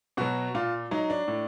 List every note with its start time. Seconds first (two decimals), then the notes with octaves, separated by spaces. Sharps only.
0.17 B2 F#3 F#4
0.55 A#2 F4
0.91 F#3 D#4
1.10 D4
1.28 A2